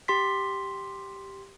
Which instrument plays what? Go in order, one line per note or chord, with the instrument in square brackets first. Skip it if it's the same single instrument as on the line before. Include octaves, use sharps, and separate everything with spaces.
[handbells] G4 C6 B6